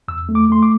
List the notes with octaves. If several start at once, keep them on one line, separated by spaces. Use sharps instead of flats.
E2 E6
A3
D6
A3 C6
D6